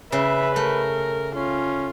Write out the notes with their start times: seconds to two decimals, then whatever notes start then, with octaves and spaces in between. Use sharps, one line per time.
0.12 C#3 B4 E5
0.56 A3 A#4
1.36 C#4 F4